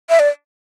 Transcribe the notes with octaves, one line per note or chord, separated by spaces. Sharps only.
E5
D5